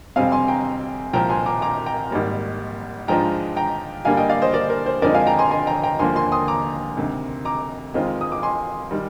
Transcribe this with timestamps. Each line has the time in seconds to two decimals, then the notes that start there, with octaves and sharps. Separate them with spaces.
0.16 F2 C3 G3 C4 F5 G#5
0.32 G#5 C6
0.48 G5 A#5
1.13 C2 A#2 F3 G5 A#5
1.30 G#5 C6
1.46 A#5 D6
1.62 A#5 D6
1.86 G5 A#5
2.11 G#1 G#2 G3 A#3
3.08 G#2 F3 G#3 D4 F4 G5 A#5
3.57 G5 A#5
4.05 G2 D3 G3 A#3 D4 F5 G#5
4.17 D#5 G5
4.29 D5 F5
4.42 C5 D#5
4.54 A#4 D5
4.70 A#4
4.86 C5
5.02 F2 D3 F3 G#3 D#4 A#4 D5
5.15 F5 G#5
5.27 G5 A#5
5.39 G#5 C6
5.51 G#5 C6
5.67 G5 A#5
5.83 G5 A#5
5.99 D#2 D3 F3 A#3 D4 G#5 C6
6.16 G#5 C6
6.32 C6 D#6
6.48 A#5 D6
6.97 D2 C3 D#3
7.45 A#5 D6
7.94 F2 D#3 G#3 C4 F4
8.21 D#6
8.32 D6
8.43 G#5 C6
8.91 D#3 G3